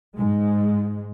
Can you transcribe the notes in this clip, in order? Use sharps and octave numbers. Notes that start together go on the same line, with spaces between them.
G#2 G#3